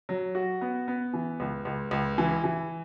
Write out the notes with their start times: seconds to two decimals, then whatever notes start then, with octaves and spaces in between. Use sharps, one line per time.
0.09 F#3
0.35 F#4
0.61 B3
0.88 B3
1.13 E3
1.40 C#2
1.65 C#2
1.91 C#2
2.18 E3
2.44 E3